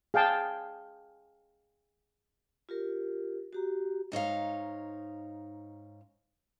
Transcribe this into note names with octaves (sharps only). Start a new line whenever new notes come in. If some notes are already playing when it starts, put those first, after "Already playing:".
G#4 F5 G5 A5
F4 G4 A#4
F#4 G4 A#5
G#2 D#4 C#5 F5